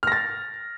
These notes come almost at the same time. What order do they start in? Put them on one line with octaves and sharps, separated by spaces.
F6 A#6 A6